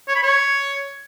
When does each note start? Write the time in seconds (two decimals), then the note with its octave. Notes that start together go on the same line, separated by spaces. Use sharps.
0.08 C#5
0.16 B5
0.23 C#5